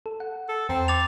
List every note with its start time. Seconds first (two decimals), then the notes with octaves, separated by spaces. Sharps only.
0.06 A4
0.20 F#5
0.49 A4
0.69 E2 C4 A#5
0.88 D6 A6 F7